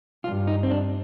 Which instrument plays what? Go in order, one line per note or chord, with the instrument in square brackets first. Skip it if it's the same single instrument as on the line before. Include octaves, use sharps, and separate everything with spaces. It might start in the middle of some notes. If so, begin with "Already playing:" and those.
[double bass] G2 [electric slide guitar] F4
[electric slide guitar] D#4
C4
D4